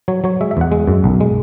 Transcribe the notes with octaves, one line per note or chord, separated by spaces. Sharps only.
F#3 C#5
F#3 C#5
G#3 E5
E5
E2 F#5
G#3
F#2
B1
G#3